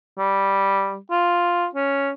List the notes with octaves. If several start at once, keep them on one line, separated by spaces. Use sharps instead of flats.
G3
F4
C#4